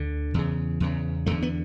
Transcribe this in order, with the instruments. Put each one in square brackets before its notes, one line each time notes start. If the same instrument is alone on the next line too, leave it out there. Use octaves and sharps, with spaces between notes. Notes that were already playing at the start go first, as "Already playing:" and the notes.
Already playing: [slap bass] D2 D3
E2 C#3
E2 C#3
E2 D3 A3
B3